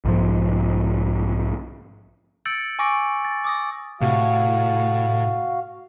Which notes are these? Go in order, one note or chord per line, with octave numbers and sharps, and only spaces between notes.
B1 G#2 F3
E6 G6 A6 C#7 D7 F#7
G#5 C#6 D6 E6 A#6 D7
A6
D6 D#6 A#6
A2 C3 F#4 F5